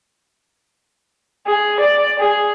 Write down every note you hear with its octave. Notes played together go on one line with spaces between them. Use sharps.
G#4
D5
G#4